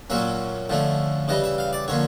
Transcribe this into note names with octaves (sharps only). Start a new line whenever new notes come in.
A#2 F#3 A#3 C#4 E5
D3 F3 A3 C#4
C#3 E3 G3 D#5
E5
F5
D5
D3 F3 A#3 C#5